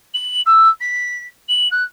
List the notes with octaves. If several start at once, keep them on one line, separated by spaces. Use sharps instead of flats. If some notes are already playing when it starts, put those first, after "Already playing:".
F#7
E6
B6
F#7
F#6